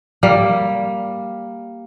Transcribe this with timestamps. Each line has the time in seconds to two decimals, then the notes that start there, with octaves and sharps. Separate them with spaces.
0.23 G3 A#3